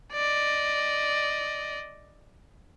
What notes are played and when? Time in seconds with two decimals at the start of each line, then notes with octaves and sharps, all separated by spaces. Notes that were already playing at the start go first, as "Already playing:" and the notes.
0.12 D5 D#5